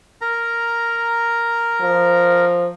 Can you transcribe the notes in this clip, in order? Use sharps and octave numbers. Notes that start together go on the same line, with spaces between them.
A#4 A#5
F3